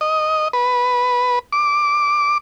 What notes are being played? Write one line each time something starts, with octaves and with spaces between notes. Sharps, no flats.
D#5
B4
D6